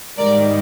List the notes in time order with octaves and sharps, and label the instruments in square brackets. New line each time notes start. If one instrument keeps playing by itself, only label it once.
[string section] G#2 D#3 G3 A#4 D5